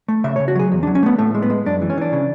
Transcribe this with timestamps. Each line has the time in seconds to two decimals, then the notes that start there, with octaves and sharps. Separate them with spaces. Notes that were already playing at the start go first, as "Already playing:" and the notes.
0.08 A3
0.24 C#3 E5
0.36 C#5
0.40 C#3
0.48 F#4
0.55 F#3 G#4
0.72 E2
0.83 D4
0.87 F#3
0.95 C#4
1.03 A3 B3
1.18 A2 A3
1.34 G#3
1.42 B3
1.50 G#3
1.66 F#2 D4
1.82 E3
1.90 C#4
1.97 E3 D4
2.13 C#3